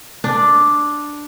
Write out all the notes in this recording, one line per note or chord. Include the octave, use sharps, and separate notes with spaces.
D4